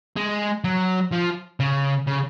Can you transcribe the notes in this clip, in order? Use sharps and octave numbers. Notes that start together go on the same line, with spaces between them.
G#3
F#3
F3
C#3
C#3